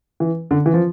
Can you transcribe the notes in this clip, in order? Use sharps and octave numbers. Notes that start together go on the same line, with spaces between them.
E3
D3
E3
F3